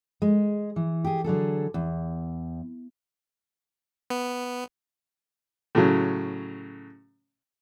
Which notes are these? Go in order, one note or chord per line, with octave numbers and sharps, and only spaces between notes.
G#3
E3
G4 G#4
D3 F#3 G#4 A4
E2
B3
A2 C#3 F#3